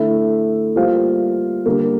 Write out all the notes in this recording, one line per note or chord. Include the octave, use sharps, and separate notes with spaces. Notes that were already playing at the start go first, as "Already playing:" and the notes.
Already playing: D3 A3 E4 A4 E5
G3 A#3 F4 C5 F5
D3 G3 A#3